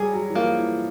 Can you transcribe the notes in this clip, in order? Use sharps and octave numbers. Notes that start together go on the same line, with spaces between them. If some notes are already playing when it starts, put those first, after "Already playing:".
Already playing: F#3 G3 G#4
F#3
E3
F3 A#3
E3